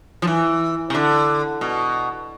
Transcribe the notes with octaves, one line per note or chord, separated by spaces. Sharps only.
F3
E3
C3
D3
B2